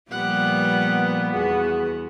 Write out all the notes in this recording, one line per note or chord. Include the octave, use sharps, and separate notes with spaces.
A#2 F3 G3 B3 G4 F#5
E2 F#4 G#4